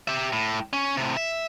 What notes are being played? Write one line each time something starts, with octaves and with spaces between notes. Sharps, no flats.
G4 E5
A2
C#4
A2 C3
E5